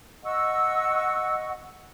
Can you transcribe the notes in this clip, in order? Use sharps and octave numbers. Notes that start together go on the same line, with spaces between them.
D#5 F#5 C#6 E6